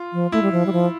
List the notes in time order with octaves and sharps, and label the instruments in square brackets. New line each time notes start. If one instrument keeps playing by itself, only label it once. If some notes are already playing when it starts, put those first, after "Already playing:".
Already playing: [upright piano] F4
[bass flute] F3
[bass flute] A3 [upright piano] E4
[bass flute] G3
F3
G3
F3